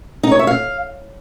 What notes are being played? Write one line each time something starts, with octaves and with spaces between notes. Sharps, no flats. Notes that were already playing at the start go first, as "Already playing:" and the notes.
D#4
C#5
E5
F5